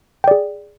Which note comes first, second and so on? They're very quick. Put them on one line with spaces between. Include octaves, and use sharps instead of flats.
G5 D5 G#4